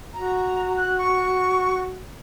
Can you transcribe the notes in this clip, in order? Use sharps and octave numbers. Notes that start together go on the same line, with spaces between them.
F#4 A#5
F#6
C#6